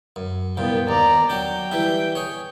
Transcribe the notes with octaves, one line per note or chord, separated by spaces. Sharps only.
F#2
C2 A#2 B3 G5
D#2 D5 A#5
F#3 D4 G5
E3 G3 E4
G#4 C#5